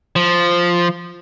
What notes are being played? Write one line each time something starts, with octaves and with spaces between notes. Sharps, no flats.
F3